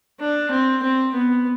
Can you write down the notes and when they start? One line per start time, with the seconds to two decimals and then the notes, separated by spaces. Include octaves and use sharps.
0.20 D4
0.51 C4
0.83 C4
1.14 B3